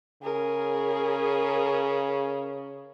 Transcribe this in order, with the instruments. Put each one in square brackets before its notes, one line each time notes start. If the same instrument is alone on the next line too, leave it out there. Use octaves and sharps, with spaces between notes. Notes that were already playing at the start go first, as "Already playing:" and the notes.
[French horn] C#3 [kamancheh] G#4 A#4